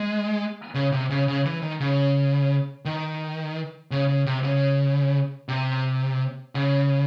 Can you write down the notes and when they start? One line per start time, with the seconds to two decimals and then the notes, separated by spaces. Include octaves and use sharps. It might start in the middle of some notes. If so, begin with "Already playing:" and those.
Already playing: G#3
0.75 C#3
0.92 C3
1.10 C#3
1.28 C#3
1.45 E3
1.62 D#3
1.80 C#3
2.85 D#3
3.91 C#3
4.09 C#3
4.26 C3
4.43 C#3
5.48 C3
6.55 C#3